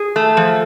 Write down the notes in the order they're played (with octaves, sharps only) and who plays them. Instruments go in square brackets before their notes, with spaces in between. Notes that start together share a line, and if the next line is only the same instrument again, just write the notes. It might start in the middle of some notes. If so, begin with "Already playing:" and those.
Already playing: [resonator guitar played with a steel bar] G#4
A3
F3